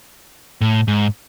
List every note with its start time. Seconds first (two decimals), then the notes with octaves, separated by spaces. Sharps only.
0.61 A2
0.88 G#2